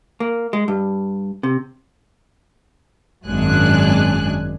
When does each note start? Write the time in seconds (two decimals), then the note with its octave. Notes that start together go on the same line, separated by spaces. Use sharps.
0.20 A#3
0.53 G#3
0.68 G2
1.43 C3
3.25 G#1 F#2 G#3 D4 G#5 F#6